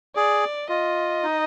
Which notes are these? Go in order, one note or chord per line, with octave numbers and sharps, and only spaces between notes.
G#4 D5
F4 D#5
D#4